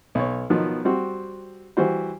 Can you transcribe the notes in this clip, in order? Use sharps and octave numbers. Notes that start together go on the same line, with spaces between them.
B1 C#5
B2 D#3 F3 F#3 B3
G3 C4 F#4
E3 G3 F#4 C5